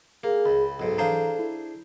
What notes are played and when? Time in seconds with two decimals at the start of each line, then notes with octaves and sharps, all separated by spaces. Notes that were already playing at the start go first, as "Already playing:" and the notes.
0.24 A#3 G#4
0.46 C#2 B5
0.80 B1 G#2 A4
0.98 E3 D4 G#4 C5 F5 A#5
1.39 E4